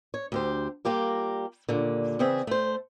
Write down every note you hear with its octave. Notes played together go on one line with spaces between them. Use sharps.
C#5
D2 G4 C5
G3 A#3 F4 G4 A#4
D#2 A#2 D3
C#3 E3 C4 G#4 E5
A3 C5